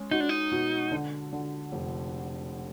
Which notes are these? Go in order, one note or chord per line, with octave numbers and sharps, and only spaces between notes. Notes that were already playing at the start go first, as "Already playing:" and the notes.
Already playing: G#3 C#4
D#4 F#4
D4
D#4
B2
D3
D3
F1